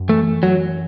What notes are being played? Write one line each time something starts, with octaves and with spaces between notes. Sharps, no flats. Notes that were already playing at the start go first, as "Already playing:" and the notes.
Already playing: F#2
E3 A3
F#2 F#3